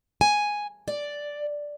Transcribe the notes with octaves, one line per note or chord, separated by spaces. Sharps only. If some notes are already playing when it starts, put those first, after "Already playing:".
G#5
D5